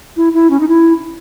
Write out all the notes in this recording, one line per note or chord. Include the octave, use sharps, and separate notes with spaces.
E4
E4
C#4
D#4
E4